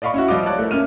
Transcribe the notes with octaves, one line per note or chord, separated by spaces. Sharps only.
D5 D#5 F5 B5 C#6
C#4 E4 F#4
F3 G3 D#5 F5 D6
C#5 D5 A5 F#6
A3 E4 A#4
A#3 C#4 E5 F6 D#7